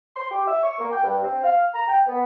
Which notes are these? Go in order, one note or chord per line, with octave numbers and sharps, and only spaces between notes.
C6
G4
E5
C#6
A#3
G5
G2
C4
F5
A#5
G5
B3